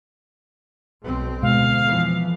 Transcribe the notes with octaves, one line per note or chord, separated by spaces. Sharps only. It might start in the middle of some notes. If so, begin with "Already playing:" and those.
B1 B2 C4
D2 B2 G#3 F5
F2 E3 F3